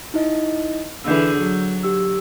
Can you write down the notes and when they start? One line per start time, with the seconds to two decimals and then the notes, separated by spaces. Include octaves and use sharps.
0.14 D#4 E4 D#5
1.04 D3 E3 G#4 E6 G6
1.38 F#3
1.83 G4 E6